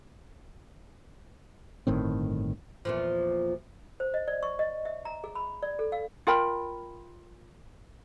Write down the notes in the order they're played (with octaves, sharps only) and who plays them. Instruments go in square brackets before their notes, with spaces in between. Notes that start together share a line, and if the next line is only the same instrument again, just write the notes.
[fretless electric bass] G1 A2 D#3 C4
[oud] E2 A#2 F3
[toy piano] C5
D#5
D5
C#6
D#5
E5
A#5
G#4
B5
D5
A4
F5
[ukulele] F4 A#4 G5 B5